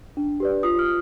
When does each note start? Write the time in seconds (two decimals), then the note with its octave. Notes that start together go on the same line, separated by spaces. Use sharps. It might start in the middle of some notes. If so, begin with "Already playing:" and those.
0.17 D4
0.40 G4 B4 D5
0.63 F4 D#6
0.79 F6